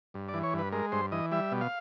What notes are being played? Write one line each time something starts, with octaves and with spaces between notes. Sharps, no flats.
G2
D5
E3
C#5
G2
B4
G#3 A#4
G2 C5
E3 D#5
G3 E5
B2
F5